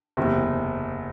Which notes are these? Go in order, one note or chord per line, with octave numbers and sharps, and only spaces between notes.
F#1 E2 C3